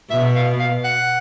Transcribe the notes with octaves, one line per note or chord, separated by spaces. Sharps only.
B2 E5
F5
F5
F#5